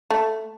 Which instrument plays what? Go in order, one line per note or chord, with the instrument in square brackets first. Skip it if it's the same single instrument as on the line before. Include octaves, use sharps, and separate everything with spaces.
[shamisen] A3